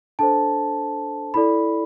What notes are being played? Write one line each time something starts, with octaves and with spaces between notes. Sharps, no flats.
D4 A4 C5 A5
E4 A4 D5 B5